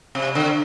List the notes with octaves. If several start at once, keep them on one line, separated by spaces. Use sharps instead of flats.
C3
D3